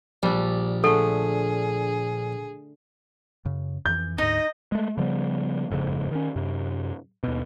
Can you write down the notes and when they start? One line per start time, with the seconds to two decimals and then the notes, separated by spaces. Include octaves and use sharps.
0.23 A#1 G3 D4
0.84 D3 A3 G#4 A4
3.45 F#2 C#3
3.86 F2 E3 G6
4.18 D2 G#2 D#4 D#5
4.72 G#3 A3
4.97 C#3 F3 G3 B3
5.71 F#1 F2 G#2 C#3
6.11 D#3 C#4
6.36 F#2 C3
7.23 D#2 B2